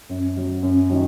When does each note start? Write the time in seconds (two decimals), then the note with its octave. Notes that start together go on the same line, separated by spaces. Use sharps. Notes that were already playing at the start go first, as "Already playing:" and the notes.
0.09 F#2
0.37 F#3
0.63 F#2
0.90 D#3 F#3